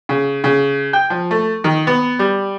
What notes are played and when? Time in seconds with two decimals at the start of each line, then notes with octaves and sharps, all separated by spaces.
0.09 C#3
0.44 C#3
0.93 G5
1.10 F3
1.31 A3
1.64 D#3
1.87 B3
2.19 G3